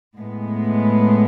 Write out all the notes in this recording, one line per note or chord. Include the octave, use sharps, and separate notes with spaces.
A2 G#3 B3